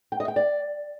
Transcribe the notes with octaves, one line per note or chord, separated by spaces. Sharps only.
G5
D#5
G5
D5